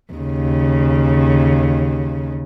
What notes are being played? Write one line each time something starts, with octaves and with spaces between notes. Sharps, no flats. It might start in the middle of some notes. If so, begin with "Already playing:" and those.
D#2 C#3